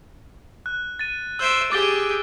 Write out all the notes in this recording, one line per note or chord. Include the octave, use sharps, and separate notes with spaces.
F#6
A6 D#7
C5 E5 E6 D7
G4 G#4 D6 A6 G7